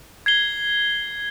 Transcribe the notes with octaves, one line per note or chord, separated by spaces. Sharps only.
G#6 C7 G7